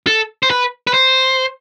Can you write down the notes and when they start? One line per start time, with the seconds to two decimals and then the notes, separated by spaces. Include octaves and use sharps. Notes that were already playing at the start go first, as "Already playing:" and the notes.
0.07 A4
0.43 C5
0.50 B4
0.87 B4
0.94 C5